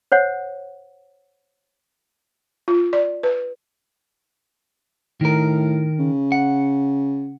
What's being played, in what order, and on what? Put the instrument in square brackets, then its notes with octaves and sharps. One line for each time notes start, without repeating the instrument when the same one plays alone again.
[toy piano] C5 C#5 F#5
[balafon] F4
D5
B4
[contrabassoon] A2 [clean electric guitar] D#3 A#4
[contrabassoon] C#3
[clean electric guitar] F#5